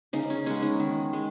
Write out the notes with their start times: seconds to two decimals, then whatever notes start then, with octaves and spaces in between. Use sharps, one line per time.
0.13 C#3 D#4
0.30 C#4
0.46 G#3 B3 C#4
0.63 D#4
0.80 D#3
1.13 G#3